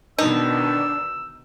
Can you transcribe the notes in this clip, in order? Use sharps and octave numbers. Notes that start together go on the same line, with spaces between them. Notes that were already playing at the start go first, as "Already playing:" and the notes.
B2 D3 D#3 D4 D#4 E6